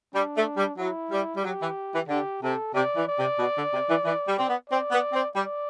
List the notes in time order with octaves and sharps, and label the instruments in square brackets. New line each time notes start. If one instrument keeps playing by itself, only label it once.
[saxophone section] G3 [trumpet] D4
[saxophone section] A3
G3
[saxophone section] F#3 [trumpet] E4
[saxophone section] G3
G3
[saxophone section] F#3 [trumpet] G4
[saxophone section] E3
E3
[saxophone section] D3 [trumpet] G4
[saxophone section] C3 [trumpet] A4
[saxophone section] C3 [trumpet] D5
[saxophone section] E3
[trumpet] D5
[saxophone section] C3
B2
D3
C3
E3
E3
G3
C4
B3
[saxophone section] C4 [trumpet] D5
[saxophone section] B3
C4
[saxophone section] G3 [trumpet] D5